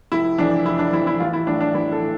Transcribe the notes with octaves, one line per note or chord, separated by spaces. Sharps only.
F1 E4
F2 E3 D4
F1 E4
D4
F2 E3 E4
E4
A1 F4
E4
A2 E3 D4
D4
A1 E4
A4
A2 E3